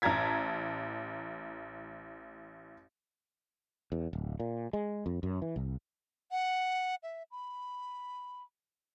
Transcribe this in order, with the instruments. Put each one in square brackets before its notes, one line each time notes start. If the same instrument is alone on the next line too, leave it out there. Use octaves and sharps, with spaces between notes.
[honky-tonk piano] A1 A5 A#5 G#6 B6
[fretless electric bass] E2
D1
A#2
G#3
F2
F#2
E3
C2
[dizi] F#5
E5
B5